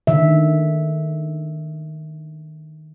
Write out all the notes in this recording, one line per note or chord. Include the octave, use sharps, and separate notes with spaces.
D3 D#3 E5